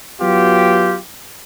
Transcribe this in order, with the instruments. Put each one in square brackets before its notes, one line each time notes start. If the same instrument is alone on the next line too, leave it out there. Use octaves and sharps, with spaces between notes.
[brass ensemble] F#3 B3 F4 G4